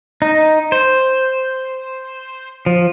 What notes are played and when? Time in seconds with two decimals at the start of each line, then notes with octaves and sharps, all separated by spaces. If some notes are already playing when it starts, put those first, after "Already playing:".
0.22 D#4
0.72 C5
2.66 F3